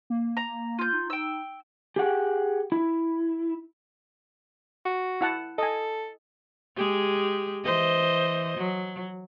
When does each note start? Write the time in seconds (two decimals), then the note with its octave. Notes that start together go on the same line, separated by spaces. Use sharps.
0.10 A#3
0.37 A#5
0.79 F4 G6
0.93 D#4
1.10 G5 E6
1.96 G4 G#4 F#5 G5
2.72 E4
4.85 F#4
5.21 E4 F#5 A5
5.58 A4 D#5 G#5
6.77 G#3 G4 G#4
7.64 E3 C5 D#5
8.57 F#3